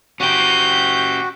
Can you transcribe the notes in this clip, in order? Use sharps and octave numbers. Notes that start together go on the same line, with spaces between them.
C#4 F#4 G4 G6